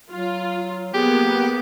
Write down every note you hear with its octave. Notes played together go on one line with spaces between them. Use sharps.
F#3 F4
A#3 B3 G4 G#4